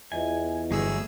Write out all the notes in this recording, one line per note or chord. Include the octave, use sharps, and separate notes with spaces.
E2 F4 D#5 E5 G#5
G1 F#3 A3 G#4 E6